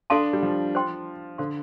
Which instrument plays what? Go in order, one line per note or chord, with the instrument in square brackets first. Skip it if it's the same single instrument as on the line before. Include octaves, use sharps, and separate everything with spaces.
[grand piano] D4 [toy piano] A4 F5 A5 C6
[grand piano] G3
F3
[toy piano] C5 G5 C6
[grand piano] D3 [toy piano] A4 C5 F5 C6